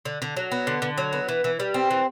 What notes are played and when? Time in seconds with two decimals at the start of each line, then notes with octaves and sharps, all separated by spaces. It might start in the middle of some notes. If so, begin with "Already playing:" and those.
0.05 D3
0.22 D3
0.37 F#3
0.51 B3
0.67 D3
0.82 D3
0.98 F#3
1.13 B3
1.29 E3
1.44 E3
1.60 G3
1.74 C4
1.90 E3